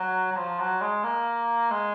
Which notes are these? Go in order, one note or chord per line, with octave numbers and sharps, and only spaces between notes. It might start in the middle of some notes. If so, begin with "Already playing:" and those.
Already playing: F#3
F#3
F3
F#3
G#3
A#3
G#3